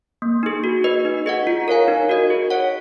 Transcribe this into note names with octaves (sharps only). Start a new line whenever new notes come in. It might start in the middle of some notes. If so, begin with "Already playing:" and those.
A#3
D#4 G#4
F#4
B4 D#5
D#4
G#4 D#5 F#5
F4
A#4 C#5 F5 G#5
D#4
F#4 A#4 D#5
G#4
C#5 F#5